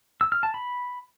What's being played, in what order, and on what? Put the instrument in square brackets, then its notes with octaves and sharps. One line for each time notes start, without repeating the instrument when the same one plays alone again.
[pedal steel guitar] E6
F6
A5
B5